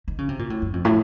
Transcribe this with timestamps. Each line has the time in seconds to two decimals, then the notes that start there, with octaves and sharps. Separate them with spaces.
0.08 D#3
0.18 C#3
0.29 C3
0.39 A#2
0.50 A2
0.62 F#2
0.73 F2
0.85 A2